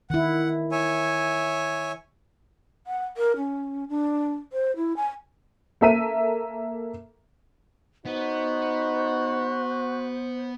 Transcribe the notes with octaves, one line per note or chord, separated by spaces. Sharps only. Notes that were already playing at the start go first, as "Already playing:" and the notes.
D#3 E4 F#5
C#5 E5 G#5
F#5
A#4
C#4
D4
C5
E4
G#5
A#3 A4 E5 A#5 B6 D#7
B3 D#4 F#4 C5